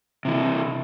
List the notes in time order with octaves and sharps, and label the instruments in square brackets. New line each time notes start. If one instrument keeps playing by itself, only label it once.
[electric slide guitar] C3 E3